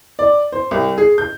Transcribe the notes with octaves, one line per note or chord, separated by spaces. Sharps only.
D5
C5
C2
G#4
G6